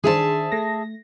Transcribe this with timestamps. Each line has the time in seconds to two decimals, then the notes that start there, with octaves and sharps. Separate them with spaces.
0.04 D#3 D4 G#4 C5 E5 A5
0.52 A3 A#6